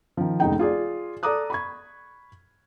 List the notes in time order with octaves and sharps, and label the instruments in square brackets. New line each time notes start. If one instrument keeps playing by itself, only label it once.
[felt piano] D#3 F3
F1 C#2 D#4 G5
F4 G#4 D5
A4 D5 A#5 D6 D#6 F#6
B5 C#6 G#6